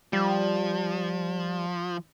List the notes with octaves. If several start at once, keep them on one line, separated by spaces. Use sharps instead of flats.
F3 G3